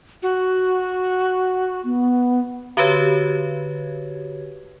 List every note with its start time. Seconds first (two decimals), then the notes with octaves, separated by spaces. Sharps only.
0.23 F#4
1.84 B3
2.77 D3 F#4 G4 B4 C#5 G#6